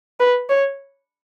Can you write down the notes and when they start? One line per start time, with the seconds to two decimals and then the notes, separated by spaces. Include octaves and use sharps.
0.20 B4
0.49 C#5